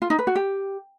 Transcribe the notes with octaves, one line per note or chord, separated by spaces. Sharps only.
F4
D#4
B4
F#4
G4